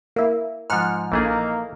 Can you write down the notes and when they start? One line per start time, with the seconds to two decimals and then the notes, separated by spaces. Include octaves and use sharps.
0.16 A#3 E4
0.70 G#2 F3 F#5 F6
1.12 A#1 E3 A3 A#3 D#4 G#4